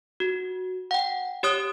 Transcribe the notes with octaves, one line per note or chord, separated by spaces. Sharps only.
F#4
F#5 G5
G4 C#5 D#6 F#6